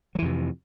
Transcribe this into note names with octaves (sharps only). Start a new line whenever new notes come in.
F2 C3 E3 F#3